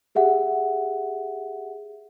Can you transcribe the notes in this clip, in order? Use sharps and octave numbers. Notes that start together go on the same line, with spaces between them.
G4 G#4 E5 F#5